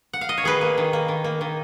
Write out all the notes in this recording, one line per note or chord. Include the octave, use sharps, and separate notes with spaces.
F#5
F5
D#5
C#5
D#3 G#4 B4
A#3
D#3
A#3
D#3
A#3
D#3